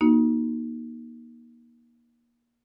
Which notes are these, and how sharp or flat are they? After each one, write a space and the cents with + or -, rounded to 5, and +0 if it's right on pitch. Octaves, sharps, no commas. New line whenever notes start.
A#3 +30 D#4 +0 F#4 -10